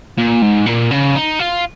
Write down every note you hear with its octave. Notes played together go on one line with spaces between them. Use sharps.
A#2
G#2
A#2
C#3
D#4
F4